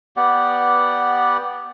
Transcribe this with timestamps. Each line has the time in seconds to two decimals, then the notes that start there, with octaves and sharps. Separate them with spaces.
0.17 B3 G4 D5 F#5